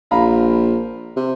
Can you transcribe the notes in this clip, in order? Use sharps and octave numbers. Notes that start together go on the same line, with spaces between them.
A#1 F5 A#5 B5
C3